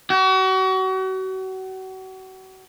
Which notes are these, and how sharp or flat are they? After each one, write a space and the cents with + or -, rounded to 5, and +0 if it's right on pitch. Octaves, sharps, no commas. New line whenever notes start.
F#4 +35